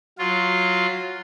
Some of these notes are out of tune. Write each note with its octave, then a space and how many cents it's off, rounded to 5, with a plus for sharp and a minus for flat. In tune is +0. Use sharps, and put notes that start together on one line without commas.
F#3 -10 F4 +0